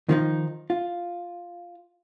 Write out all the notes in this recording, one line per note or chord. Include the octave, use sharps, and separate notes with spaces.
D#3 F3 D#4
F4